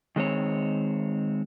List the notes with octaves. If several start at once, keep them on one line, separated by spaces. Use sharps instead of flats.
D#3 G#3 C4 C#5